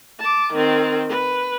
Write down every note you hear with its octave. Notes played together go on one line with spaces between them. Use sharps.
A5 D6
D#3 C4
B4